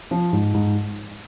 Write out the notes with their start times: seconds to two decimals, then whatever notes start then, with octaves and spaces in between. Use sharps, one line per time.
0.11 F3
0.33 G#2
0.54 G#2